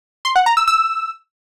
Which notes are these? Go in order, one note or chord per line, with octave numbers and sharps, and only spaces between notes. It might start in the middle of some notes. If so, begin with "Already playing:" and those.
C6
F#5
A#5
E6
E6